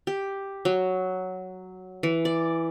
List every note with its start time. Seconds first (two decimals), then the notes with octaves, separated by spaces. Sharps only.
0.07 G4
0.65 F#3
2.03 E3
2.25 D5